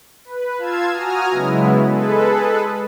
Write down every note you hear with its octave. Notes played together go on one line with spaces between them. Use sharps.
B4
F4 F5 A5 E6 G#6
F#4 G#5 A#5 D#6 F6
C#3 F#3 G#3 B3 E4
G#3 G#4 A4 B4